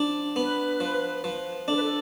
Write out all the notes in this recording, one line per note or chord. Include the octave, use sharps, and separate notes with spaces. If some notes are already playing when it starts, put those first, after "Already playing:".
Already playing: F3 D4
B3 B4
F3
F3
D4 A4
B4
A4